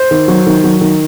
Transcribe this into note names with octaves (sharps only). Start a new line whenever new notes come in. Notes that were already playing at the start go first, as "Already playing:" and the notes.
Already playing: C5
D#3
F#3
D#3
F#3
D#3